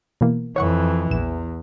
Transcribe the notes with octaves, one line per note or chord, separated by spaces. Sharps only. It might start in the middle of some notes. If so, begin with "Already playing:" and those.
B2 E3 A#3
F2 E3 C#5 F#5 C#6
A#1 E2 E7